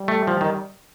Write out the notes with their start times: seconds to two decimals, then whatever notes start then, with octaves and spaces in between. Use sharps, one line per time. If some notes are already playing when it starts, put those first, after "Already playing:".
Already playing: G3
0.08 A3
0.27 F3
0.41 D#3